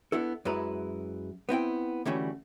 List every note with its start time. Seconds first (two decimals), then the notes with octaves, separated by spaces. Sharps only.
0.12 B3 D4 E4 A4
0.45 F#2 F#3 G#3 E4 B4 A#5
1.49 B3 C4 E4 G5
2.05 D3 E3 G3 A3 C#4 F#4